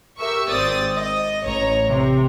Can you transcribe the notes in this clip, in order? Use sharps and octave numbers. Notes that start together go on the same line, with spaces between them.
G4 A#4 E5 C#6 E6
G#1 C4 D5 D#6 A6
D#5
A1 C#5 A#5
C3